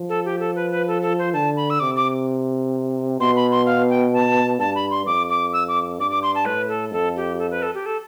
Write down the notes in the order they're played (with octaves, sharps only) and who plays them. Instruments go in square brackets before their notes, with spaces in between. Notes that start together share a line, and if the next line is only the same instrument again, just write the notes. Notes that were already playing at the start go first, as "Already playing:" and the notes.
Already playing: [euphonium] F3
[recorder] A4
G4
A4
B4
B4
A4
A4
C5
[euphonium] D3 [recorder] A5
[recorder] B5
E6
[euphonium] C3 [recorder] D6
[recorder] D6
[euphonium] B2 [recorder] C6
[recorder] B5
C6
F5
G5
A5
[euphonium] G2 [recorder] A5
[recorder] B5
C6
[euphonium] F2 [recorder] D6
[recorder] D6
E6
D6
[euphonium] G2 [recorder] D6
[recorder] D6
C6
A5
[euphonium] A2 [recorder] B4
[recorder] A4
[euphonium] F2 [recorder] A4
[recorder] G4
A4
B4
A4
G4
A4